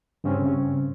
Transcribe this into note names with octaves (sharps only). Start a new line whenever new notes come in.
G2 C#3 C4 C#4